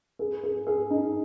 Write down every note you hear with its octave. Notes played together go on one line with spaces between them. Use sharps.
G#4
G#4
G#4
D#4